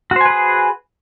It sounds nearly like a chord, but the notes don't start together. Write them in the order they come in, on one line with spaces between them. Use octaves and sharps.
F#4 C5 G#5 B4 G#4